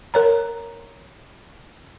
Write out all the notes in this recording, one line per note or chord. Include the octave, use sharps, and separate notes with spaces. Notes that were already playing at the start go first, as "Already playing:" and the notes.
A#4 C#5 A#5